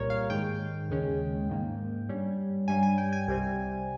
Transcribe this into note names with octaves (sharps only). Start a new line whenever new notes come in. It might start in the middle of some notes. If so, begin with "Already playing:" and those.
Already playing: C2 A#2 G3 A#4 C#5
F5
G#2 D#3 G#3 G5
D#2 C#3 G#3 C#4
G#2 D#3 A#3
G2 G3 C#4
G2 G3 C#4 G#5
G#5
G5
G#5
C2 C3 G3 C4